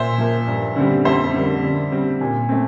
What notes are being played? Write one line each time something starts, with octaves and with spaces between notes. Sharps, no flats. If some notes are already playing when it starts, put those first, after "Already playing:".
Already playing: A#2 C5 E5
F3 A#3
G2
D3 G3 C4
F2 C5 E5
D3 G3 A#3
D3
G3 C4
A#2
A3 C4